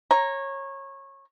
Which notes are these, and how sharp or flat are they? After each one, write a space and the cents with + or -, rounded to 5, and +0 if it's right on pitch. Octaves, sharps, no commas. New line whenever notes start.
C#5 -20 A#5 +0